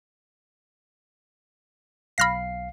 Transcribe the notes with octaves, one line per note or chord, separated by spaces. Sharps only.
B1 F5 B5 F6 A#6 C7